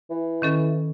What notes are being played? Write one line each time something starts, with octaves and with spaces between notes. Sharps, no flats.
E3
D#3 C#4 A4